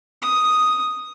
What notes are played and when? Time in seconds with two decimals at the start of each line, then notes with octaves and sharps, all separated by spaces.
0.22 D#6